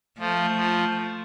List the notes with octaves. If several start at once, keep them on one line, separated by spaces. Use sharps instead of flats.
F3 A3
F3